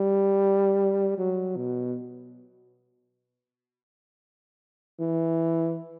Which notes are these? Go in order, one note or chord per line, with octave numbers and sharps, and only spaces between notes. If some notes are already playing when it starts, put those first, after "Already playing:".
Already playing: G3
F#3
B2
E3